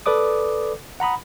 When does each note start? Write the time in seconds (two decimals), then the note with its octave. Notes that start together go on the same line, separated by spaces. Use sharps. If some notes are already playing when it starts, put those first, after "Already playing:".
0.06 A4 B4 D5 D6 D#6
1.00 F#5 A#5 B5 D#6